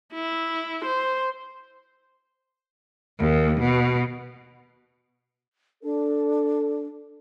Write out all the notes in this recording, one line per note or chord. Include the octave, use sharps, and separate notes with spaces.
E4
C5
D#2
B2
D4 A4